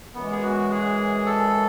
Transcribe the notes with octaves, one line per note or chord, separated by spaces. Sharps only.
F#2 E3 G#3 B3
G#4
F#4
G#4
A4